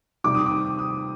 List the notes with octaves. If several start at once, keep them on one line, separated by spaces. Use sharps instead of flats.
C3 D#3 G3 D6
D#6
D6
D#6